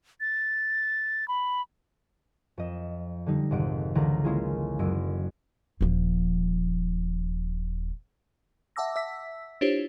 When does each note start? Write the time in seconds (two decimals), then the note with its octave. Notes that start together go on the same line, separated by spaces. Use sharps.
0.21 A6
1.28 B5
2.58 F2 D#5 E7
3.26 D3 G3 D#4
3.51 G#1 F2 C3 D#5 F#5 D7
3.95 C#2 D3 E3 D5 F#5 A#5
4.24 G#3 A#3 C#4 E4 F4 G#4
4.79 F#1 F#2 D#5 E6 D7
5.81 D#1 F3
8.76 E5 F#5 A5 D6 E6 A#6
8.96 E5 E6 B6
9.61 D4 E4 F4 G4 C5 C#5